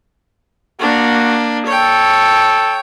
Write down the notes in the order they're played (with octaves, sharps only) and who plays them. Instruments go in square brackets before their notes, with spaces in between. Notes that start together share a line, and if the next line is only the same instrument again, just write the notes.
[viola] A#3 D4 [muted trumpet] F#4
[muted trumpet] A4 [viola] C#5 G5